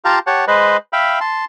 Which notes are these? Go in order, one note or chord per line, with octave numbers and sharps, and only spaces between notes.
F4 G4 F5 A5 A#5
G4 C#5 F#5 A5
G#3 B4 C5 D#5 B5
E5 F5 G5 B5
A5 C6